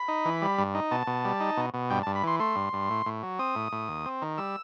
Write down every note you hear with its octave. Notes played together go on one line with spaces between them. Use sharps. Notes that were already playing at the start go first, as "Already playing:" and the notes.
Already playing: B5
D#4
E3
G3
G2
D#4
B2 A5
B2
G3
D#4
B2
B2
G2 G5
G2 A5
B5
E3 C6
A3 C6
G2
G2
A2
A2
F#3
C4 D#6
A2
A2
D#2
C4
D#3
G3 E6